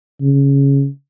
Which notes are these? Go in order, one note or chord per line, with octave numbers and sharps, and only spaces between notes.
C#3